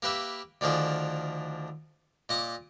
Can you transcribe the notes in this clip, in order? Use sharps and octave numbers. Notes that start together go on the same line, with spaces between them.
A#3 G4 B4 E5
D2 D3 D#3 F3 G#4
A#2 D#5 D6 D#6